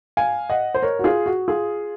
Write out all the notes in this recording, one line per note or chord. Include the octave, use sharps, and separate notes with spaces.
F5 G#5
D#5 F#5
C5
A#4 C#5
F#4
F4 G#4
F#4
F4 G#4